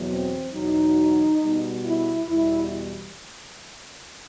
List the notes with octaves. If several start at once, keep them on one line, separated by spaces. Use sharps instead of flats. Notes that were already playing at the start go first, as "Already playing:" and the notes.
Already playing: E2 B2 F#3
C4
E2 B2 F#3 D#4
B2 G3
E4
E2 B2 G3 E4